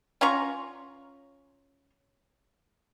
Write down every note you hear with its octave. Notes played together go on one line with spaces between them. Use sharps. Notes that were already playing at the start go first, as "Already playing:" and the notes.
C#4 F4 A#5 C#6